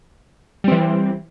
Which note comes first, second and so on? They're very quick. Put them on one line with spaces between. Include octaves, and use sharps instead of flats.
G3 C4 E3